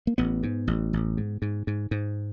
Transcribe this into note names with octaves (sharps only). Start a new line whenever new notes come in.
A#3
A1 B3
G#2
A1
A1
G#2
G#2
G#2
G#2